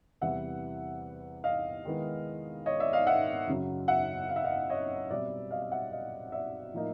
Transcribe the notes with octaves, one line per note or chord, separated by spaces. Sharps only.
E2 C3 E3 G3 E5 F#5
D#5 F5
D#3 G#3 B3 E4
C#5 D#5
D5 E5
D#5 F5
E5 F#5
F#2 C#3 F#3
E5 F#5
F5
E5
D#5 F5
C#5 D#5
B2 G3 C4 D5 E5
D#5 F5
F5
E5 F#5
D#5 F5
D5 E5
A2 F3 A#3 D#4